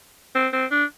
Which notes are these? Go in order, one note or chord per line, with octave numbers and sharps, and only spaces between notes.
C4
C4
D4